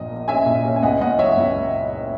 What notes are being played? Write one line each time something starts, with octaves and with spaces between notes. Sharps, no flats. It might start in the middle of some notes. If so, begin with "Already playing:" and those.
Already playing: A#1 A#2 D#5
A#3
C#4 E5 G#5
A#2
C#4
G#5
C#2 D#5 F#5
C#2 D#5 F#5
F#3 C#5 E5
C#2